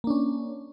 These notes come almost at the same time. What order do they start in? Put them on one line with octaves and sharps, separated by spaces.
A#3 D4 C#4